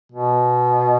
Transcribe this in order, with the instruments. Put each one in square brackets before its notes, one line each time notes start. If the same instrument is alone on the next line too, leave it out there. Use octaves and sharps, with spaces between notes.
[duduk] B2